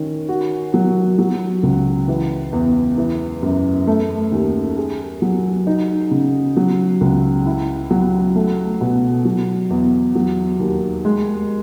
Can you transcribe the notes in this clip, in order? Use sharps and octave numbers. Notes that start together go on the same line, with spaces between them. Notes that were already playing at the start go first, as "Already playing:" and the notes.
Already playing: D#3 C#4
F#4
F#3
F#3
C#2
E3
E2
E3
F#2
A3
D#2
G#4
F#3
D#4
C#3
F#3
C#2
E4
F#3
A3
B2
F#3
E2
F#3
D#2
G#3